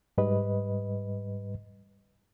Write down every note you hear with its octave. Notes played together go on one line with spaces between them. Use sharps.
G#2 G3 B4 D#5